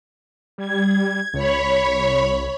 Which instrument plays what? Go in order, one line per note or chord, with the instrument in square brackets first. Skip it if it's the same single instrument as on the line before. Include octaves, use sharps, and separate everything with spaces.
[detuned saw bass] G3 [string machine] G#6
[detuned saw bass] C#2 [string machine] C#5 B5
[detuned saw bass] C2